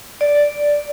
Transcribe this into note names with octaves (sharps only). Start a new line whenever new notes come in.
D5